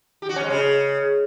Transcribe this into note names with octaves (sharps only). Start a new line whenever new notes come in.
G4
F#4
C#4
G#3
C#3